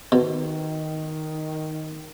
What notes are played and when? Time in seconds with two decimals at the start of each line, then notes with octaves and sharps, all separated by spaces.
0.12 B2 D#3